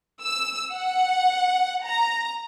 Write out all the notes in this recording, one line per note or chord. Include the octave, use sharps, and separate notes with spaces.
E6
F#5
A#5